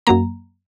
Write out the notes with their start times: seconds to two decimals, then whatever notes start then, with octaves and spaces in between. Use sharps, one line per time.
0.07 F#2 F#3 A#3 A#5